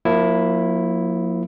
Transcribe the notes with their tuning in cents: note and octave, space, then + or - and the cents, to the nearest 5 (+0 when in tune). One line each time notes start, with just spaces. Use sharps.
F3 +40 A#3 +0 E4 +0